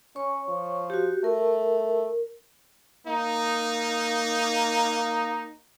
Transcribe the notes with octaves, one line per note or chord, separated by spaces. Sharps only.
C#4 C#5 C#6
F3
F#4 G4
A3 A#4
A#3 D#4